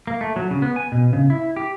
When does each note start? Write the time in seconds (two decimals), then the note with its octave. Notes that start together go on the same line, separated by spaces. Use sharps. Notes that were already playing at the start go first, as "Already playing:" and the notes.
0.07 A#3
0.21 A3
0.36 F#3
0.51 C#3
0.62 B3
0.76 G#5
0.92 B2
1.13 C#3
1.30 E4
1.56 G4